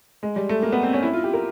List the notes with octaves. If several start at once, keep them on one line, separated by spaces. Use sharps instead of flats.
G#3
G3
A3
A#3
B3
C4
C#4
E4
F4
G4
A#4